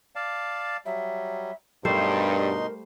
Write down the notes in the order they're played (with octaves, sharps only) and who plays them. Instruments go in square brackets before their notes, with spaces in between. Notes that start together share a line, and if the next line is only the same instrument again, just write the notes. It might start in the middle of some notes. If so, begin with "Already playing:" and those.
[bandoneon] D5 F5 A5
[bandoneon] F#3 G3 [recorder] E5
[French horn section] G2 [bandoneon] B2 D#4 C6 [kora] G3 A3 C5 [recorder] A#4